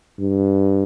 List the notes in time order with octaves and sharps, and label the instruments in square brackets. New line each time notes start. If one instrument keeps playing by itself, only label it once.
[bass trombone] G2